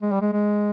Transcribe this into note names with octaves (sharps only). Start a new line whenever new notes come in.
G#3
G3
G#3
G#3